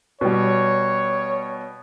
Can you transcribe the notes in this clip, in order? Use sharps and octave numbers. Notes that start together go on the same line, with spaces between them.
B2 G3 C#5